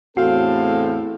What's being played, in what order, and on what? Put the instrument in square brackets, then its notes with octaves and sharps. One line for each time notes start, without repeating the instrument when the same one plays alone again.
[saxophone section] E2 C4 F5 [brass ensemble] A2 A4 [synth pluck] F#4